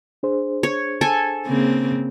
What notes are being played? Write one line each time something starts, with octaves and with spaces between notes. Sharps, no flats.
D4 G#4 C5
C#5
A4 G#5
C#3 A#3 C4